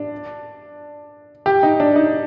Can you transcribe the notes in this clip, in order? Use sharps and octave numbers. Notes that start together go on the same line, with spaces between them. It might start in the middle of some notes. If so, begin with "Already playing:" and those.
Already playing: D4
G4
D#4
D4
D#4